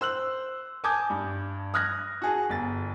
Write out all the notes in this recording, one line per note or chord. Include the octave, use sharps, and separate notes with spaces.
C5 E6 F#6 F#7
G#5 A5 D6 D#6 G6 G#6
G2
D#6 F6 F#6 G#6 A#6
F#4 G#4 A5
G1 A6